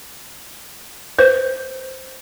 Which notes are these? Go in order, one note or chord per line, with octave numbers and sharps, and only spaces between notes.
B4 C5